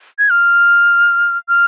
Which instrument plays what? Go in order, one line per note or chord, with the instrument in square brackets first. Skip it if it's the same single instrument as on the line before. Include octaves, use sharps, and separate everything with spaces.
[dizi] G#6
F6
F6